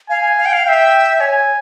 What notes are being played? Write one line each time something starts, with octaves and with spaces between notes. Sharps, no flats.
F5 G#5
F5
G5
F5
E5 F5 G5
C#5 G#5